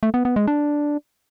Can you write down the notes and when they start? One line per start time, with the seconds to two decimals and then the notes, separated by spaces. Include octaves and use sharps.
0.03 A3
0.14 B3
0.25 B3
0.36 G#3
0.47 D4